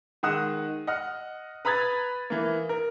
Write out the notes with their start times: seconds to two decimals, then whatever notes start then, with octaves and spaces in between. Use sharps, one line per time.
0.23 D#3 G#3 F#5 D#6 F#6 E7
0.87 D#5 F#5 F6
1.65 B4 A#5 B5 D#6 G#6 A6
2.30 E3 A#3
2.69 A#4